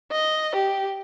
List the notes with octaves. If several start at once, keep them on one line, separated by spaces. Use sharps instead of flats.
D#5
G4